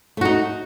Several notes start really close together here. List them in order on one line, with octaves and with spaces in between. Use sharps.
A3 F#4 D#4